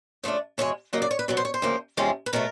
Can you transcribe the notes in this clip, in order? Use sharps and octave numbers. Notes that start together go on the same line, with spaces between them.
C#3 F3 A3 D4
E2 B2 G#3 C#5
C#3 F#3 A#3 D#5
D5
C#5
B4
B2 F#3 B3
C5
C#5
C5
D2 C#3 F3 A#3
E2 C3 F3 G#3 C#4
B4
B2 F#3 A3 A#4